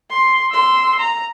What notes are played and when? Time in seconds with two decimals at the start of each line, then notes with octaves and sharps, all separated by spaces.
0.11 C6
0.51 C6 E6
1.00 A#5